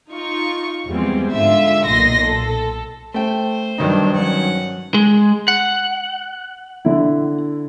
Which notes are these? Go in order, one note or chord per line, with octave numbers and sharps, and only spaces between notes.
D#4 F4 C#6
E2 F3 G3 G#3 C4
G#2 D3 F4 E5
B1 A#2 D#5 C6 A#6
A4
A3 C5 G5
G2 D#3 F#3 D4 D#4
F#3 C#4 F#5
G#3
F#5
D3 E4